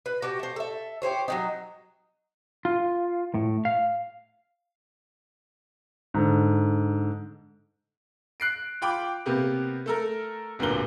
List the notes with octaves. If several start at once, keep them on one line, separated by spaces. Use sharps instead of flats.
B4
F#4 G4 A5
A3 C5
A4 E5
G4 G#4 C5 C#5
F#3 G#3 D#4
F4
A2
F5
G#2 D3
F#6 C7 D7
F4 G5 B5 D6
C3 A#3 B3 G4
A3 A4 A#4
D1 G1 G2 A#2 A#4 G7